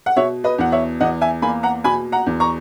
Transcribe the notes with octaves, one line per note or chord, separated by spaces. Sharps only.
F#5
B2 C#5 E5
B4 D#5
E2 F#5
C#5 E5
E2 D#5 F#5
E5 G#5
A#3 G#5 B5
F#5 A#5
B2 G#5 B5
F#5 A#5
E2
A#5 C#6